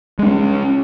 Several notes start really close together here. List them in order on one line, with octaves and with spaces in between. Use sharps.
G#3 D4 C#4